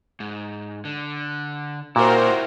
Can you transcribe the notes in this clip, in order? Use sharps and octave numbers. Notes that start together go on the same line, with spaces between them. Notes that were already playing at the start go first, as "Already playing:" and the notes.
G#2
D3
A#2 E4 F#4 G4 A#4 C5